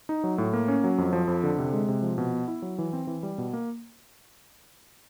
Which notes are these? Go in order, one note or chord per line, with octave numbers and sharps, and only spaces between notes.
D#4
F#3
A2
A#3
C#4
F#3
F2
F3
F2
D3
C3
G#3
C3
F3
B2
B3
E4
F#3
E3
C4
E3
G3
B2
A#3